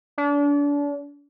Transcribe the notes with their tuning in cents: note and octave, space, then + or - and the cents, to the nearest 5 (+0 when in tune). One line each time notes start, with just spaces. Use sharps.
D4 -35